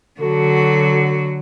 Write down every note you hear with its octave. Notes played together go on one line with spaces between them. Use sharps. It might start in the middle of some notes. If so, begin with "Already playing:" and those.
D3 F#3 F#4 A4